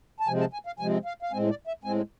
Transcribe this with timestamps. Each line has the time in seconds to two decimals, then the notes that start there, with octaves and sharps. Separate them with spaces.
0.20 A5
0.27 C3 F3 G#3 C4 G#5
0.40 A5
0.53 G#5
0.67 F5
0.79 C3 F3 G#3 C4 G#5
1.05 F5
1.22 F5
1.31 A2 G#3 C4 G#5
1.50 D5
1.67 E5
1.84 A2 G#3 C4 G#5